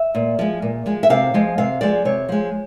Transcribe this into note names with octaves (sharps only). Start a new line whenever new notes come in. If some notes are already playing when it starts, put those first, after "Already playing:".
Already playing: E5
A#2
F3 G#3
A#2
F3 G#3
E5
C3 F5
F3 G#3
C3 F5
F3 G#3 D5
C3 C#5
F3 G#3